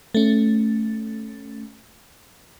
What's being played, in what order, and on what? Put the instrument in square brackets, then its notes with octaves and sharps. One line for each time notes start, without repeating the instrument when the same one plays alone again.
[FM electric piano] A3 C#4